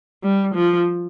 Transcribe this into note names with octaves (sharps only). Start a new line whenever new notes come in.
G3
F3